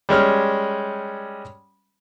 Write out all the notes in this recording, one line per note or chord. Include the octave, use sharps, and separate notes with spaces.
G3 G#3 C#4 F6